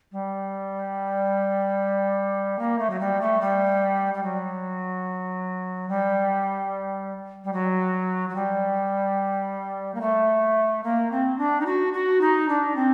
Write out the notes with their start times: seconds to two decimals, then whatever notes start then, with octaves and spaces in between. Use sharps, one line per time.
0.12 G3
2.59 A#3
2.79 A3
2.90 F#3
3.00 G3
3.21 A3
3.41 G3
4.14 G3
4.23 F#3
5.89 G3
7.44 G3
7.53 F#3
8.29 F#3
8.35 G3
9.94 A#3
10.01 A3
10.84 A#3
11.12 C4
11.38 D4
11.60 D#4
11.66 F#4
11.93 F#4
12.21 D#4
12.49 D4
12.76 C4